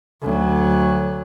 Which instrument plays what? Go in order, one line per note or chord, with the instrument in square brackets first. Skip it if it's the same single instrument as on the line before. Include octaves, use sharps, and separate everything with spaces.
[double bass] D2 F#3